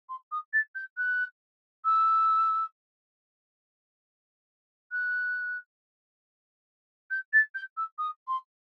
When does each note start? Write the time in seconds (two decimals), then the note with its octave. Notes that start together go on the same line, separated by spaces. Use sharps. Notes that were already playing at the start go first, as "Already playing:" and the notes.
0.09 C6
0.31 D#6
0.53 A6
0.75 G6
0.97 F#6
1.85 E6
4.92 F#6
7.11 G6
7.33 A6
7.55 G6
7.77 E6
7.98 D#6
8.28 C6